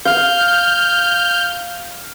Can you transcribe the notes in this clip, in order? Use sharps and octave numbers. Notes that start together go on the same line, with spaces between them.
F5 F6 G6